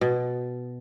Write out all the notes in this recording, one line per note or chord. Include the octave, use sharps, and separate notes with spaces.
B2